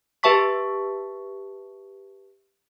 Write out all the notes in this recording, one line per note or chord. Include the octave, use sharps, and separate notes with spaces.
G4 B4 E5 A5 C#6 B6